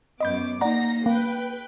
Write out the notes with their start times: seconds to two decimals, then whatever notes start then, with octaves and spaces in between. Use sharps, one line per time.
0.20 F#2 B3 D#5 B5 D6 G6
0.61 A#3 D#4 D5 F#5 A#5 A#6
1.06 A#3 B4 G5